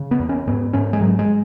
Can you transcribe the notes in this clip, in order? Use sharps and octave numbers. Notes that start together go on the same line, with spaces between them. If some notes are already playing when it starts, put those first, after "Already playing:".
Already playing: C#3
B3
E2
C#4
G#2 B3
G#2 C#4
G#3
G#2 F#3
G#3